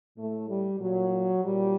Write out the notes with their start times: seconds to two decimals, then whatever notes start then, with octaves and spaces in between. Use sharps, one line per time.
0.17 A2 A3
0.49 G3
0.80 A#2 F#3
1.45 A#2 G3